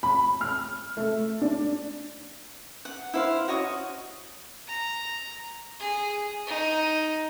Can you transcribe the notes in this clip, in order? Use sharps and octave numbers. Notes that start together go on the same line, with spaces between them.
B5
F6
A3
D4
F#5
E4 C5 F5
F#4 C#5 D#5 C#6
A#5
G#4
D#4